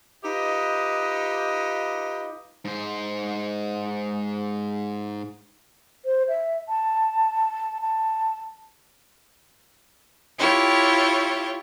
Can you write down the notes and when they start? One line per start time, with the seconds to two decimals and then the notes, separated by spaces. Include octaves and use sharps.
0.24 D#4 F4 G4 B4 D#5
2.65 G#2 C5
6.05 C5
6.28 E5
6.69 A5
7.81 A5
10.39 E4 F4 G4 C#5